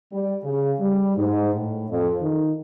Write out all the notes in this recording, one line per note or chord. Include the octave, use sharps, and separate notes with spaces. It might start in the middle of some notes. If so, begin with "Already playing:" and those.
G3
C#3
G3
G#2
A2
F2
D#3